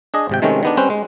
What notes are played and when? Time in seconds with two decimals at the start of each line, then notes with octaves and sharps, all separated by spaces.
0.14 D4 G#4 D#5
0.29 G#1 C3 G5
0.42 C3 D#3 G#3 A3 C4 C#4
0.63 D#3 B3 D4
0.77 G3 C4 C#4 B4 C5
0.90 G#3